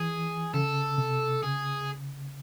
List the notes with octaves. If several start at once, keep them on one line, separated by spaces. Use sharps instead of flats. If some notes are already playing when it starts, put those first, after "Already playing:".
Already playing: E3 G#4
C#3 A4
C3
C#3 G#4